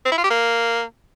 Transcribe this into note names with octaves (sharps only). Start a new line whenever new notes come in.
C4
E4
F4
G4
A#3